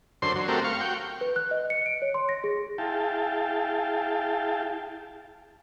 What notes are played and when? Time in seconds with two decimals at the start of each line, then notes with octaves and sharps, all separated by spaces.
0.22 F#2 D3 C5 C6
0.36 F#3
0.48 A3 C4 F#4 G4 A#4
0.64 F5 C#6
0.81 F#4 G5
1.21 B4
1.36 F#6
1.51 D#5
1.70 C#7
1.86 D7
2.02 C#5
2.14 C6
2.29 A#6
2.44 G#4
2.78 E4 G#4 F5 G5 A5